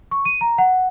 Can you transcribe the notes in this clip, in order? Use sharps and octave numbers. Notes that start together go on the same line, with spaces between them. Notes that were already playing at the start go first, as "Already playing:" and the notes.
C#6
D#7
A#5
F#5